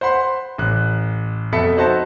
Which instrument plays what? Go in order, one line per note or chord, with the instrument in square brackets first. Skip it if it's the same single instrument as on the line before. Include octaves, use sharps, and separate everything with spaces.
[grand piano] C5 F#5 B5 C6
A1 F#6
F2 B2 A4 E5 B5 C#7
D#4 F#4 C5 E5 A5